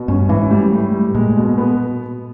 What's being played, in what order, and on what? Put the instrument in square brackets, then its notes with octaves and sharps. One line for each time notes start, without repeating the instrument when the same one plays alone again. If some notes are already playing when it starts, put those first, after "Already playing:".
Already playing: [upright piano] B2
[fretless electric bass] G2 [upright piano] C#4
[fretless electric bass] G#2 [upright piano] E3
[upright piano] G3
A2
G3
[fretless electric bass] A#2 [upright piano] G#3
[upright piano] B2
B3